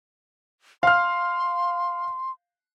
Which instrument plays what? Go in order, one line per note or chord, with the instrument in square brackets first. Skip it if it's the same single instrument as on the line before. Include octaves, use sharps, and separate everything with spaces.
[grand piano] F5 F6 [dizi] C6